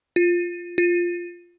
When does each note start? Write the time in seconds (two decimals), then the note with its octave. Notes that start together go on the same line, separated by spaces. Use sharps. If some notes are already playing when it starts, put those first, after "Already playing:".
0.16 F4
0.78 F4